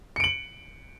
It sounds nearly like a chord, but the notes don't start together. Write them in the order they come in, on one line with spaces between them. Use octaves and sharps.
C#7 D7 F#7